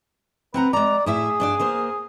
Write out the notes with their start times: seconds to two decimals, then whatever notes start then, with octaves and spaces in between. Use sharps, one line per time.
0.54 C4 B4 F#5 A#5
0.73 G#3 D5 A#5
1.06 A2 E4 G#4 E5
1.40 G2 D4 D5
1.59 A#3 A#4 C5